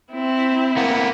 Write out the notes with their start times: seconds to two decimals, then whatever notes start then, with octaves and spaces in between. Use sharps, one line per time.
0.12 C4 E4
0.77 A#3 B3